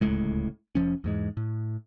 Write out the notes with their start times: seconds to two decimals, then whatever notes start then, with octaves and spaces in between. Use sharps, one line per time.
0.01 D1 C#2 A2 G#3
0.75 F1 F#2 F3 C#4
1.04 E2 G#2 G#3
1.37 A2